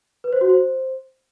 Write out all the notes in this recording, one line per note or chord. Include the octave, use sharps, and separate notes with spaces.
B4
C5
F#4
C5